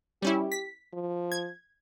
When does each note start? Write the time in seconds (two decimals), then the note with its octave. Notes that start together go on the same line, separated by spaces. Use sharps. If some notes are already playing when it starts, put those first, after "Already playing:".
0.22 G3 C#4 E4 G4
0.52 B6
0.93 F3
1.32 G#6